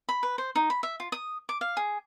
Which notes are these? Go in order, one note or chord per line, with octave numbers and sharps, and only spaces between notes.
B5
B4
C5
D#4
B5
E5
F4
D#6
D6
F5
G#4